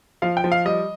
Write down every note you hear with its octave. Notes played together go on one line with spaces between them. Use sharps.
F3 F5
G5
F3
F5
G3 D#5